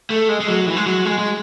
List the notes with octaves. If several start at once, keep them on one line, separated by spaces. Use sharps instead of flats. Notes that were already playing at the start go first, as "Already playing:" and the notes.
A3
G#3
G#3
F#3
E3
G#3
F#3
G#3
G#3